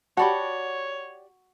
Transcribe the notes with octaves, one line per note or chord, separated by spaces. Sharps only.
F#4 G4 C#5 D5 F#5 A5 B5